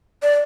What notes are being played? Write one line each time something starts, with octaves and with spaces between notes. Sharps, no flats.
D5